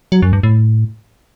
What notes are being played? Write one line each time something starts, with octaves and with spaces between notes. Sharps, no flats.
F#3
F#2
G2
A2